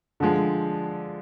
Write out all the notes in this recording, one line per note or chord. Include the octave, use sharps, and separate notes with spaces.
D3 F3 G#3